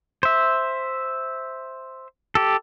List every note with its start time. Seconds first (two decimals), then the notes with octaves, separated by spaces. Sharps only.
0.23 C5 E5
2.35 G4 A4